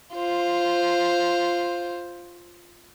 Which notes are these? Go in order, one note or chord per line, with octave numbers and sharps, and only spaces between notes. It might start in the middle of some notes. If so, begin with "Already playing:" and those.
F4 C5